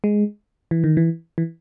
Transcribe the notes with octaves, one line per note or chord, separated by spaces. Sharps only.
G#3
E3
D#3
E3
E3